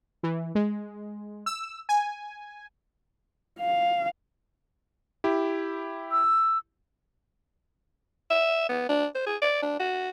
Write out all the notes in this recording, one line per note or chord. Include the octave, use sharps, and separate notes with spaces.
E3
G#3
E6
G#5
F5
E4 G4
E6
E5
B3
D4
C5
G#4
D5
D4
F#4